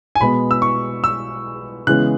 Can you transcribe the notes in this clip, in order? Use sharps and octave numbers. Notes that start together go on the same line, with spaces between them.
G#5
B2 G#3 B3 B5
E6
C#6
E6
C#3 E3 G#3 B3 F#6